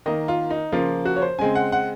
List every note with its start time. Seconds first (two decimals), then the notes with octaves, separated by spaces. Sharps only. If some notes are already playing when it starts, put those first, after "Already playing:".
0.06 D#3 A#3 D#5
0.28 F4
0.50 D#4
0.72 C#3 F3 A#3 F4
1.05 F#4
1.16 C#5
1.22 C5
1.38 C#3 G#3 C4 G#5
1.55 F#5
1.72 F#5